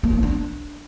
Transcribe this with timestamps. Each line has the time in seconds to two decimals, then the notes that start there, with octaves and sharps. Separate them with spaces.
0.03 A#3
0.13 D#4
0.23 D4